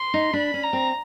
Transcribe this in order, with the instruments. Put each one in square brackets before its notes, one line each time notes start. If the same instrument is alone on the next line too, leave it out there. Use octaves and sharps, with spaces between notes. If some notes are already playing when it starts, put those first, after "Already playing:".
Already playing: [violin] C6
[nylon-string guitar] D#4
[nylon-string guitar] D4 [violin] B5
[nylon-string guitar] C#4
[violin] A#5
[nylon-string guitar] C4